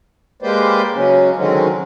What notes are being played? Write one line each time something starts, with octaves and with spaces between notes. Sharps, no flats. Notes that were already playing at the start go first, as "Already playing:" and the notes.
G#3 A#3 G4 B4 C5 D5
C#3 F#3 C#4
D3 D#3 F#3 G#3 C4 C#4